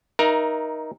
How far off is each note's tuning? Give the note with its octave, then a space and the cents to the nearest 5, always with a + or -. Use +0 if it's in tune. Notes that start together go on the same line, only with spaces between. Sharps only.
D#4 +0 A#4 +25 E5 +20